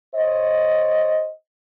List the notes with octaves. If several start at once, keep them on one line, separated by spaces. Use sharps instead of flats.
C5 C#5 D#5